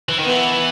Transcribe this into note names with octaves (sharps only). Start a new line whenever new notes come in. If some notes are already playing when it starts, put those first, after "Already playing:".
E3
D#3
B3
E3